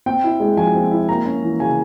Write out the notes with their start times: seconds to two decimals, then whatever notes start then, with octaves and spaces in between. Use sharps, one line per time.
0.06 C4 G5
0.24 E4
0.40 G#3
0.57 F3 G#5
0.75 C4
0.91 E4
1.09 A#3 A#5
1.25 C#4
1.43 E3
1.60 C#3 G#5